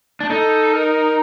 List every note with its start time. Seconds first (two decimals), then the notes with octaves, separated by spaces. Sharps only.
0.20 D4
0.30 D#4 A4
0.73 A#4